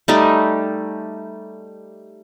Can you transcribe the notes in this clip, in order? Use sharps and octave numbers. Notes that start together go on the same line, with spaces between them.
G3 A3 D#4 G4